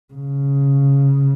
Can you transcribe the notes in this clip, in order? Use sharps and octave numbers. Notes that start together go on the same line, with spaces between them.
C#3